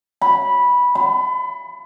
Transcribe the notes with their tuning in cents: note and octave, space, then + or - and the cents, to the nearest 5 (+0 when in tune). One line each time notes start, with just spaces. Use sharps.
B5 -10
B5 +35